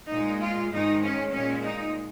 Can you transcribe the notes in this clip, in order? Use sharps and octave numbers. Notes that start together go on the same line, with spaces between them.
A#2 G#3 D#4
F4
G#2 D#3 G#3 D#4
C#4
A#2 G#3 C#4
D#4